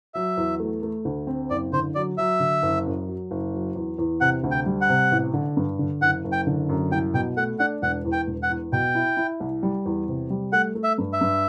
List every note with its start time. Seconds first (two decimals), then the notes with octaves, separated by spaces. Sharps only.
0.14 F#3 E5
0.37 E2
0.60 A3
0.83 A3
1.05 D2
1.27 C4
1.50 F#1 D5
1.73 D3 C5
1.95 F#3 D5
2.18 F#3 E5
2.40 D3
2.63 F#1
2.86 F#2
3.08 F#3
3.31 F#1
3.53 F#3
3.75 E2
3.98 E2
4.21 C3 F#5
4.44 D2
4.51 G5
4.66 G3
4.81 F#5
4.89 C3
5.11 A1
5.34 D3
5.57 G2
5.79 D3
6.01 F#1 F#5
6.24 F#1
6.32 G5
6.47 D3
6.69 F#2
6.92 C2 G5
7.14 B2 G5
7.37 A3 F#5
7.59 D4 F#5
7.82 E1 F#5
8.05 E2
8.12 G5
8.27 E1
8.43 F#5
8.50 E2
8.72 B2 G5
8.95 E4
9.17 E4
9.40 C2
9.63 G3
9.86 E2
10.08 C3
10.30 G3
10.53 A3 F#5
10.75 A3
10.84 E5
10.98 G2
11.13 E5
11.21 G2